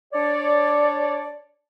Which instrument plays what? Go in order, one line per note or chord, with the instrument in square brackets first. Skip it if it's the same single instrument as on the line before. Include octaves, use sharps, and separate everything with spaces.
[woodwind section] D4 C#5 D5